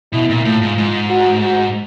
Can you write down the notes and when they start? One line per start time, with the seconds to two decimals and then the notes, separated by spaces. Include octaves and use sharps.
0.13 B2 E4
0.30 A#2
0.45 A2 F4
0.62 G#2
0.78 G#2
1.09 F#4
1.42 F#4